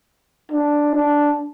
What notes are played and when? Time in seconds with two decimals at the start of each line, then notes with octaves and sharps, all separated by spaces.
0.52 D4
0.95 D4